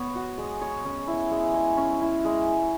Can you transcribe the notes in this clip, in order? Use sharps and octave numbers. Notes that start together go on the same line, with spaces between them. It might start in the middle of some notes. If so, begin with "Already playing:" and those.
Already playing: B3 C#5
F#4
G#3
C#5
C#4
E4
G#3
G#3
C#4
E4
G#3